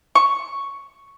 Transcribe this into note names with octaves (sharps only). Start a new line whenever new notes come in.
C#6